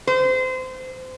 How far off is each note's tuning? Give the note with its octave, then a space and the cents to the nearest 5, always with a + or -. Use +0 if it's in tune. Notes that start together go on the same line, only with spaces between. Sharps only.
C5 -25